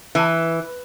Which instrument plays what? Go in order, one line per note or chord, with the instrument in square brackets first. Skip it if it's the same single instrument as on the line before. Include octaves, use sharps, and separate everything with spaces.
[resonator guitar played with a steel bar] E3